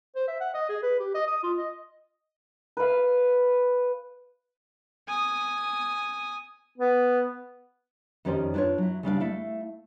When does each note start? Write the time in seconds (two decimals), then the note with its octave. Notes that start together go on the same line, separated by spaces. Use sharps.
0.16 C5
0.28 E5
0.41 F#5
0.54 D#5
0.69 G#4
0.83 B4
1.00 G4
1.15 D#5
1.27 D#6
1.43 F4
1.58 D#5
2.77 B4 F5
5.08 G#5 D#6
6.78 B3
8.25 F2 D#3 C#4 G4 C5 D5
8.54 D4 E4 F4 B4 C#5
8.78 F#3 E4
9.03 C#3 G3 D4 F5
9.20 A3 E4 F5